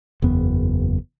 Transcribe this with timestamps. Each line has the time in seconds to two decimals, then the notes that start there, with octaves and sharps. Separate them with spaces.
0.22 F#1 E2 B3